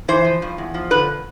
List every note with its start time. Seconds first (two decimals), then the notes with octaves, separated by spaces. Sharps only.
0.08 E3 C5
0.24 F3
0.42 G2
0.58 E2
0.74 F3
0.90 D3 B4